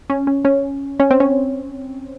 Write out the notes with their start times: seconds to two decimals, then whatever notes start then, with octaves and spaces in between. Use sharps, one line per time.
0.10 C#4
0.27 C#4
0.45 C#4
1.00 C#4
1.11 C4
1.20 C#4